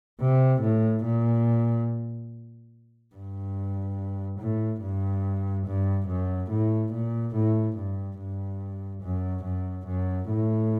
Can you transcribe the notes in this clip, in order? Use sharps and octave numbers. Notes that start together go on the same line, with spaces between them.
C3
A2
A#2
G2
A2
G2
G2
F#2
A2
A#2
A2
G2
G2
F#2
F#2
F#2
A2